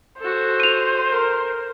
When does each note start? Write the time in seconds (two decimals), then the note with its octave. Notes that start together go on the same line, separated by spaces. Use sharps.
0.20 F#4 A4 C5
0.60 D#7 F7
1.10 A#4